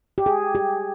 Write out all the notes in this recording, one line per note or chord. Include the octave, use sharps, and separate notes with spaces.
G4
G#4
G4